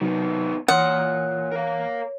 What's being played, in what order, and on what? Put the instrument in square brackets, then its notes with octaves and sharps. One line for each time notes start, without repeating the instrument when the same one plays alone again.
[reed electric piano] C3 F#3 [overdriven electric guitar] D#3 B3
[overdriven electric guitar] A#2 C6 [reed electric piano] E3 D#6 F6 [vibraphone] C#5 [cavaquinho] F#5
[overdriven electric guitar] A#4 F5